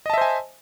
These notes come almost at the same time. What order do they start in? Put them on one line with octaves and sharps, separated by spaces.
D#5 A5 E5 C5 G#5